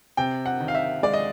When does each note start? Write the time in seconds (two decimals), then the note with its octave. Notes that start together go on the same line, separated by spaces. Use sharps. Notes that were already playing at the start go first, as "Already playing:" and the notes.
0.17 C3 G5
0.46 F#5
0.60 D#3
0.68 F5
0.75 E5
1.03 G#3 D5
1.14 D#5